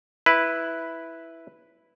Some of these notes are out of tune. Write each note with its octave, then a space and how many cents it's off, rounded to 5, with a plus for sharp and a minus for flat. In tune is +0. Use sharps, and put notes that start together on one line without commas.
E4 +0 B4 +0